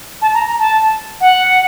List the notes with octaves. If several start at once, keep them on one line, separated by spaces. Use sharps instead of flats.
A5
A#5
A#5
A5
F#5